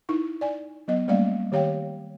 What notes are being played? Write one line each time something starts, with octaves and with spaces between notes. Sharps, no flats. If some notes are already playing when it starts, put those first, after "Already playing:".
D#4 E4 C#6
D5 G#5
F#3 B3 D#5
G3 A3 A#3 C#4 D5 F5
D#3 G4 C#5 F5 G5